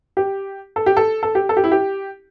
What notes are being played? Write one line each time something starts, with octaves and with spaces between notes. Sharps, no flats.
G4
A4
G4
A4
A4
G4
A4
G4
E4
G4